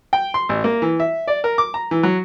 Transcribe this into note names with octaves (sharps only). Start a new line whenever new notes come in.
G5
C6
A1
A#3
E3
E5
D5
A#4
D6
A#5
E3
F#3